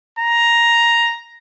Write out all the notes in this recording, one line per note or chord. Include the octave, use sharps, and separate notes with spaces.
A#5